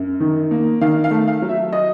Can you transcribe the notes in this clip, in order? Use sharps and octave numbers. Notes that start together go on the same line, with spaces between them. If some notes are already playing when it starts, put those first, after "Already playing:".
Already playing: F#2
D#3
A#3
D#3 F5
F5
A3
F5
F#3
E5
D#5